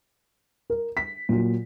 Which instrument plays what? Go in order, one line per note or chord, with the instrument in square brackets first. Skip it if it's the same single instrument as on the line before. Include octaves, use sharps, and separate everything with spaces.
[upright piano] A#4
B6
A#2 F#3